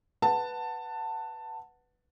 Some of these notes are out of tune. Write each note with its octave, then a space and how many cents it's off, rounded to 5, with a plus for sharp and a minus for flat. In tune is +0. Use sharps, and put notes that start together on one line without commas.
B4 +0 F#5 +0 A5 +15